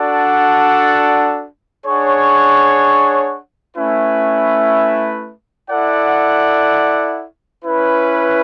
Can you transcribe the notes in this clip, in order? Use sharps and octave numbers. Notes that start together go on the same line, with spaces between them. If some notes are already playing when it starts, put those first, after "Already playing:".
Already playing: D4 F#4 A4 D5 F#5
D4 G#4 C#5 F#5
A3 C#4 E4 B4 E5
E4 A4 D5 F#5
C#4 E4 B4